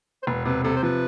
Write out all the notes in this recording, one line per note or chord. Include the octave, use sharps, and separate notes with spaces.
C5
E1 B4
C3 B4
C3 A4
C5
F3 B4